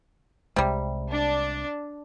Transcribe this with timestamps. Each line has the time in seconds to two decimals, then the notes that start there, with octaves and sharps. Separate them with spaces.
0.56 C2 C3 G3 G#3
1.10 D4